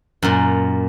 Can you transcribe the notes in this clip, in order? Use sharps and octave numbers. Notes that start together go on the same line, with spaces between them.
F#2 A#2